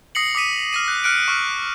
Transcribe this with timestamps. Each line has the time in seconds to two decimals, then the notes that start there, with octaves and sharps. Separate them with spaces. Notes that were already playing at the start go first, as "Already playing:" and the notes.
0.15 D#6 A#6 C7 C#7 F#7
0.35 D6 D#6 B6 D#7
0.73 F6 A#6 D#7
0.88 F#6
1.04 F6 F#6 C#7 D7
1.28 C#6 F6